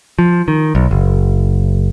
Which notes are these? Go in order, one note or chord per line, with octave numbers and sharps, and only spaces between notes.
F3
D#3
B1
F#1